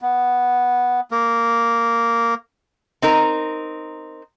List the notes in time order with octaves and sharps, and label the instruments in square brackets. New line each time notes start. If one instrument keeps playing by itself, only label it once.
[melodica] B3
A#3
[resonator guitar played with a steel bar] C4 D#4 A#4